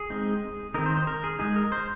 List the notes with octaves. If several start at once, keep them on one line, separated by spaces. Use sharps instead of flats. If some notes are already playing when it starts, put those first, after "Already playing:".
Already playing: G#4
G#3 C4 D#4
D#3 C4 D#4 A#4
C5
C5
A#4
G#4
G#3 D#4 G#4
A#4
C5